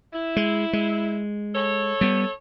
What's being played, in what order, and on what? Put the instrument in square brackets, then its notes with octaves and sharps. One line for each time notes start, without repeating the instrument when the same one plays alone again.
[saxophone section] E4
[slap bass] G#3
G#3
[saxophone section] A4 C#5
[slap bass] G3 B3